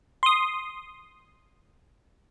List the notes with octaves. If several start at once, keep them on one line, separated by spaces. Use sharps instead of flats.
C6 D#6